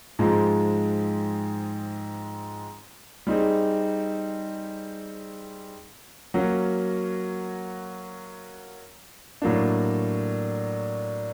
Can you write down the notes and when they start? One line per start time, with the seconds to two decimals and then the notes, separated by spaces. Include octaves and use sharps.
0.19 G#2 F3 G#3 C4
3.27 G3 C4 D#4 G#4
6.34 F#3 A#3 C#4 F#4
9.42 A2 F#3 A#3 D4